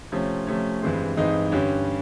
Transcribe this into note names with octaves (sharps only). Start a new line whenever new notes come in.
C3 F3 A3 C#4
C3 F3 A3 C#4
G2 E3 G#3 C4
G2 E3 G#3 C4 D#4
G2 D3 G3 C#4